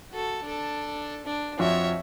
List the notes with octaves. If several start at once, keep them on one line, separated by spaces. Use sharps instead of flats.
F#4 A4
D4 A4
D4
F2 F3 F#4 C#5 E5